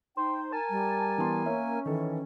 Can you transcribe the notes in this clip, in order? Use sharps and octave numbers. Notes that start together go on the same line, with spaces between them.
D#4 C5 G5
A#4 G#5 A5
G3
E3 B3 C6
A#3 C#4 E5
D#3 E3 A4